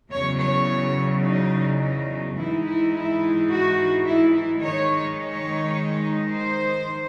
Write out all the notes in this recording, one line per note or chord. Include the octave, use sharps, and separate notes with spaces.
E2 C#3 F#3 C#5
C#5
D#4
D#4
G#2 E3 G#3 D#4 E4
E4
E4
F#4
E4
E4
D#3 G#3 D#4 C#5
C#5
C5